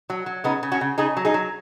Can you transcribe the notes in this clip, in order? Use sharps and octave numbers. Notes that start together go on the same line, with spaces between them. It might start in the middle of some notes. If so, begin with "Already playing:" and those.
F#3
F#3
C#3 B3 D#4
C#3
C#4 F#4
C#3
C#3 D#4 G#4
F#3
D#4 G#4
F#3